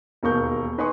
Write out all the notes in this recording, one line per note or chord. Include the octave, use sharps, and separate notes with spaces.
E1 D#2 A#4 C#6 G6
D#4 B4 G#5 C6 C#6